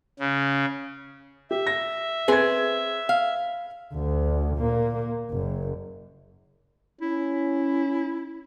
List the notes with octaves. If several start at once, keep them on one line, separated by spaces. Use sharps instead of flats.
C#3
G4 E5
A#6
C4 G#4 B4 G#6
F5
D2
A#2 A#3
F#1 F#2
C#4 E4